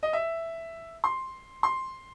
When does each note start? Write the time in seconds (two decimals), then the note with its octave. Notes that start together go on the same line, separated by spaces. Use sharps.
0.03 D#5
0.13 E5
1.04 C6
1.63 C6